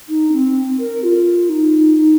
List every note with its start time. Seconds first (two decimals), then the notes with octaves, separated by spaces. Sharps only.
0.09 D#4
0.32 C4
0.79 A#4
1.03 F4
1.49 D#4